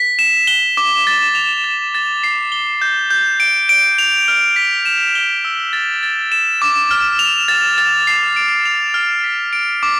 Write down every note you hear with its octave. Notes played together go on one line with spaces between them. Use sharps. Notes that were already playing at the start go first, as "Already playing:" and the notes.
Already playing: B6
E7
G7
D6
A6
F7
A6
A6
C7
G7
G6
G6
D7
D7
F7
F6
B6
E7
G7
E6
A6
A6
E7
D6
F6
F7
A6
A6
C7
D7
F7
F6
B6
D7
D6